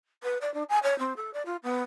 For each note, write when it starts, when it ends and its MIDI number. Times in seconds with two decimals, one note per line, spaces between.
0.23 0.38 71
0.41 0.52 74
0.54 0.63 62
0.69 0.79 80
0.83 0.97 73
0.99 1.13 60
1.17 1.31 69
1.34 1.42 74
1.46 1.56 65
1.63 1.83 59